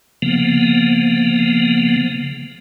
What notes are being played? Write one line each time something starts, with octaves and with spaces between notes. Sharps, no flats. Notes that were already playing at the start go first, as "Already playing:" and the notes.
C#3 F3 A#3 B3